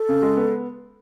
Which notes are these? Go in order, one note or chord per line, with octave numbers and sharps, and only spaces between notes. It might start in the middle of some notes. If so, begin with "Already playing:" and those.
Already playing: A4
C#3
G#3
B3